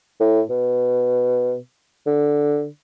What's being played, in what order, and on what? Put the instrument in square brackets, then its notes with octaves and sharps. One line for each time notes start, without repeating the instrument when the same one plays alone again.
[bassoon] A2
B2
D3